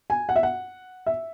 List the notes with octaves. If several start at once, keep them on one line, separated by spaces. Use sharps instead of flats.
G#5
F#5
E5
F#5
E5